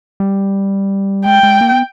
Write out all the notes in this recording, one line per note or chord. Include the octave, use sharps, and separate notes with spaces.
G3
G#3 G5
G#3
A#3
B3